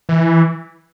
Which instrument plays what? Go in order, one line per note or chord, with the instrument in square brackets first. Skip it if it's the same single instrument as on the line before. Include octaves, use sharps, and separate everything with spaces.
[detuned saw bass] E3